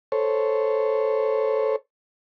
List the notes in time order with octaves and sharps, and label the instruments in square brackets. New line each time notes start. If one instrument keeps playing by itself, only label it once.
[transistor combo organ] A4 C5 C#5